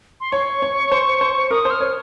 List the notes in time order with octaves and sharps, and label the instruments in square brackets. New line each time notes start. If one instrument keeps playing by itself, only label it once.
[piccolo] C6
[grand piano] C#5 [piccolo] C#6
[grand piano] C#5
C5
C5
[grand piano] A#4 [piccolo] D#6
[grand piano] C5
[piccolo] F6
[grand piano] C#5